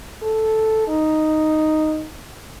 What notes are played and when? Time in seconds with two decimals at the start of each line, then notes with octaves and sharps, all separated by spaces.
0.22 A4
0.88 D#4